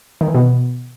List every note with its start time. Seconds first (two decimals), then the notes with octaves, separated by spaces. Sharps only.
0.21 D#3
0.28 E3
0.35 B2